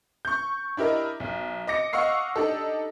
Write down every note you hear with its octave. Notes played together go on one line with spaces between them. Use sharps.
C#6 G6
D4 E4 G4 A#4 D#5
B1
D#5 D6 A#6 C#7
D#5 F5 F#5 C#6 E6 C7
D4 D#4 G4 A4